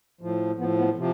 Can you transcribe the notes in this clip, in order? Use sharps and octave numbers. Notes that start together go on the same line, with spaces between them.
A2 F3
A2 F3 B3
B3
C3 F3